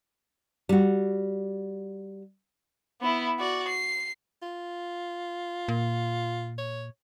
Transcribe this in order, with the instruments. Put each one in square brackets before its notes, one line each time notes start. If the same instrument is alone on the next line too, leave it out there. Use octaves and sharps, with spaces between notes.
[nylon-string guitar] G3 F#4
[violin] B3 E4
F#4 D5
C7
[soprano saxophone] F4
[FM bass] A#2
[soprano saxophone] C#5